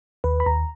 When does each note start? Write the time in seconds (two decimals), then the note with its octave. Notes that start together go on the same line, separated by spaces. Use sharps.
0.24 D#2 B4
0.40 B5
0.46 D#2 A#5